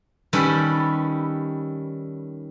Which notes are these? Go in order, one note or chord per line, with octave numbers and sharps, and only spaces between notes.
D#3 G3 C#4 A4 B4